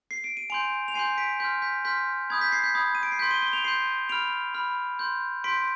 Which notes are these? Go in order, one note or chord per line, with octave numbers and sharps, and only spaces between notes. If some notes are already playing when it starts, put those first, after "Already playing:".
C7
D7
D#7
G#5 C6 G6 D7 F7
F7
G#5 C6 G6 C7 D#7
B6 D7
C6 F6 G6 B6
G6 B6
C6 F6 G6 B6
B5 D#6 G6 G#6
G6 B6
G#6 C7
G6 B6
B5 D#6 G6 G#6
D#7
D7
C7
C6 G6 B6
D#7 G7
D#7 G7
D7 F7
C6 G6 C7 D#7
B5 F6 D7 F7
B5 F6
C6 G6
C6 G6 B6 D7